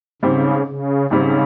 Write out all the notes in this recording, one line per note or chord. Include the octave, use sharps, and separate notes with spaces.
G#1 G#2 C#3 G3 C4
C#3
G#1 G#2 C#3 G3 C4